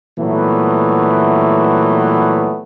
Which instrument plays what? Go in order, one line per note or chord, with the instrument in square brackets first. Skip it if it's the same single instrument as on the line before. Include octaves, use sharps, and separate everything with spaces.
[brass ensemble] A#2 E3 F#3 G3 A3 B3